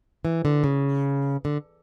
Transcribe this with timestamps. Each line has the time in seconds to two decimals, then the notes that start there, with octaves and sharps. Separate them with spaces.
0.25 E3
0.45 D3
0.64 C#3
1.45 D3